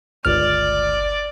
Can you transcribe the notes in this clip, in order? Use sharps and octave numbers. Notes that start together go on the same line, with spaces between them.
G1 C#2 D5 F6